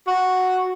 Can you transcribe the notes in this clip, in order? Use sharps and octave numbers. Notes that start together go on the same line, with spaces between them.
F#4